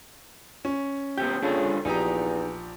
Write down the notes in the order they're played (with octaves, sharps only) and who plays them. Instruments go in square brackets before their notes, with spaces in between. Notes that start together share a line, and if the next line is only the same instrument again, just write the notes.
[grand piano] C#4
[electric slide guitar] B3 C#4 G4 [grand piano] G6
[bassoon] C#3 [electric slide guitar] D4 F4 A4
[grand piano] A#1 G4 A#5 [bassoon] E2 [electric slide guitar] D#4